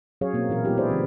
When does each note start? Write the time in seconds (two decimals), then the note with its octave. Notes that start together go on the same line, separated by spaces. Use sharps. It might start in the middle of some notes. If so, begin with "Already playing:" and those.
0.21 F#3 C#4 G#4 C#5 F5
0.33 B2 A#3 C4
0.49 A#2 E3 E4 A#4
0.65 F#3 G#3 B3 D#4 F4 G4
0.77 E4 G4 G#4 C5 D5
0.90 C#3 E3 C4